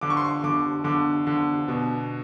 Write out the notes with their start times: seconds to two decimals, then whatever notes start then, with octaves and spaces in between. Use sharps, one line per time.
0.01 D3 D6
0.10 C#6
0.17 C6
0.24 C#6
0.44 D3 D6
0.84 D3 D6
1.27 D3
1.68 B2